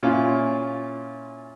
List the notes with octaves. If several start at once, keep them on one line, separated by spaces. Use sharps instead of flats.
A#2 C#4 E4 F4